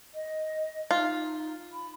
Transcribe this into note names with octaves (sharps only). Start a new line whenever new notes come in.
D#5
D#4 F4
B5